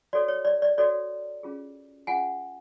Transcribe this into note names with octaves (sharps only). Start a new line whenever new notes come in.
F#4 A4 C#5 D5
C#5
D5
D5
F#4 A4 C#5 D5
C#4 F4 G#4
C#4 F4 G#4 F#5 G#5